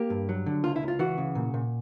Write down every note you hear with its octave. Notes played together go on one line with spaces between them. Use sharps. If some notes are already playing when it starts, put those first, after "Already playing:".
Already playing: A#3 G4
G2
F#3
D3
C#2 F4
E4
C#2
F4
E3 F#4
C#3
A#2
A#2